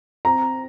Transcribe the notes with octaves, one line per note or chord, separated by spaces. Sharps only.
C4 A#5